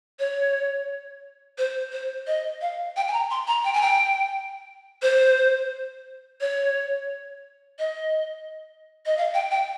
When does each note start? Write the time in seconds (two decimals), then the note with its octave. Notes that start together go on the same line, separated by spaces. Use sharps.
0.19 C#5
1.58 C5
1.92 C5
2.27 D#5
2.61 F5
2.96 G5
3.08 G#5
3.13 A#5
3.31 C6
3.47 A#5
3.64 G5
3.73 G#5
3.82 G5
5.02 C5
6.41 C#5
7.79 D#5
9.06 D#5
9.18 F5
9.34 G5
9.51 G5